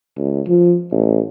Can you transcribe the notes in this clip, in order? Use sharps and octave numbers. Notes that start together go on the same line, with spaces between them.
C#2
F3
A1